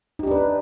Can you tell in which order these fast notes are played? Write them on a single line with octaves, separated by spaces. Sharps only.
D#4 G4 D4 B4